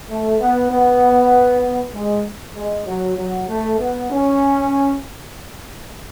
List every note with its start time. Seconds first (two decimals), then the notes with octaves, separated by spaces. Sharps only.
0.10 A3
0.40 B3
0.71 B3
1.94 G#3
2.56 G#3
2.86 F#3
3.18 F#3
3.49 A3
3.79 B3
4.10 C#4